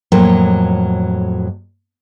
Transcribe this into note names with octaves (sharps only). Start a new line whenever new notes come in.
F2 A2 F#3 A#3